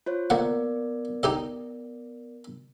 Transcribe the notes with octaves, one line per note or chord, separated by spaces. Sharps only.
F4 C5 C#5
A#3 B3 A#4 D5 F#5
D#4 G4 D#5